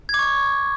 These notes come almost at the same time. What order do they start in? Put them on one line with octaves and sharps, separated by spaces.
G#6 D6 C#6